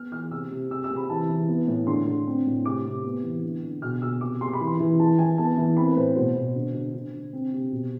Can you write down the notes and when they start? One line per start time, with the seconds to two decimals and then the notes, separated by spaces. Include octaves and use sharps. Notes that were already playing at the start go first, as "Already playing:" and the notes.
Already playing: B3 F6
0.12 E3 F6
0.31 C3 E6
0.52 C3
0.70 C3 E6
0.84 E6
0.90 C3
0.96 B5
1.10 E3 A5
1.29 E3
1.48 B3
1.67 A2
1.87 D3 C6
2.07 D3
2.27 C4
2.46 A2
2.65 C3 D6
2.85 C3
3.04 B3
3.23 E3
3.43 D3
3.63 D3
3.82 B2 F6
4.01 B2 E6
4.21 C3 D6
4.41 C3 C6
4.53 B5
4.60 E3
4.67 C6
4.80 E3
4.99 E3 A5
5.18 E3 G#5
5.38 B3 A5
5.57 E3
5.77 C4 B5
5.87 B4
5.96 A2 C5
6.16 B2 C5
6.36 B2
6.55 D3
6.74 D3
6.94 D3
7.13 D3
7.33 C4
7.52 C3
7.72 B2